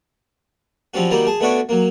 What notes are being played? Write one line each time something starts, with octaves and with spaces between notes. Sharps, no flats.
F3 G3 C4 C#4 F#4
D#3 F#3 G3 A#3 D#4 D5
G#4 A5
A3 B3 D4 F#4 C#5 D5
F#3 A#3